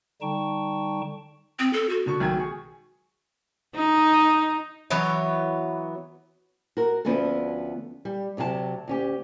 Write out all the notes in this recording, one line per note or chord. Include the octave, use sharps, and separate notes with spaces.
D3 G3 D#4 G5 A5 C#6
C4 D#6
A4
F#4
B2 D3 C#6
B1 D#3 G#6
G#4 C#6
D#4
E3 F#3 B3 C#5
F#4 A#4
D2 F3 B3 C#4 F#4 A4
G3
D2 C3 F#3 A4 A5
D2 C#4 G4